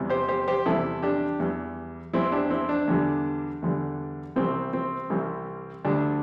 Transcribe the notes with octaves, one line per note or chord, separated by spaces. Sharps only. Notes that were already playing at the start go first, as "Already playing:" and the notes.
Already playing: E2 C3 E3 G3
G4 C5
G4 C5
G4 C5
E2 C3 E3 G3 E4 A4
D4 G4
E2 E3 G3
E2 E3 G3 C4 E4
D4 G4
C4 E4
D4
E2 D3 G3
E2 D3 G3
C2 C3 E3 G3 C4
C4
C2 C3 E3 G3
D2 D3 G3 D4